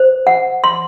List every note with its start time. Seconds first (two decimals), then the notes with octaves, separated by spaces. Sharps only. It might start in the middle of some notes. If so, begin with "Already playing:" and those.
Already playing: C5
0.27 F#5
0.64 C6